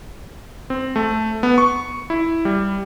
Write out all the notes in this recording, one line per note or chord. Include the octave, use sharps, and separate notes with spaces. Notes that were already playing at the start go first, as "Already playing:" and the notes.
C4
A3
B3
C#6
E4
G3